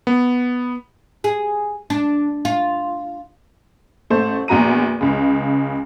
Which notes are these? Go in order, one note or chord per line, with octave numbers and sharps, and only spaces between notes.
B3
G#4
D4
F4
A1 A3 C5
A#1 E2 F#4 A#5 D#7
C#2 C#3